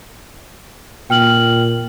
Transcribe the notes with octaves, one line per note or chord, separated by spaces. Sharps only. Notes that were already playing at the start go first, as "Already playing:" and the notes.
A#2 G5 F6 F#7